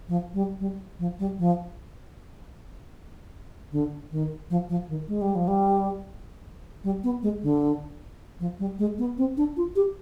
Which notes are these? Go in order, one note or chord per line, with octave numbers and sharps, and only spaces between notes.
F3
G3
G3
F3
G3
F3
D3
D#3
F3
F3
D#3
G#3
G3
F3
G3
G3
B3
G#3
D3
F3
G3
G#3
B3
C4
D4
F4
G4